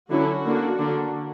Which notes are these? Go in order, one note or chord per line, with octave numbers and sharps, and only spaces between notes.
D3 F#3 C#4 E4 F#4
D3 A#3 D4
D3 A#3 D4